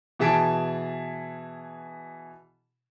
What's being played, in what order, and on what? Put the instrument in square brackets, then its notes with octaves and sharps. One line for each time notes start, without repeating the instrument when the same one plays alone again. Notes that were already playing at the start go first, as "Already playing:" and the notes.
[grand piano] B2 E3 G#4 A5 B6 D7